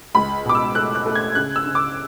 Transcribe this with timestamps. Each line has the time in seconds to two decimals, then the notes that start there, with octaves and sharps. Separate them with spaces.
0.15 C#2 B5
0.45 B2 D6
0.55 E6
0.75 A3 F#6
0.95 F#6
1.06 A3
1.15 G#6
1.35 C#3 F#6
1.56 E6
1.66 C#3
1.75 D6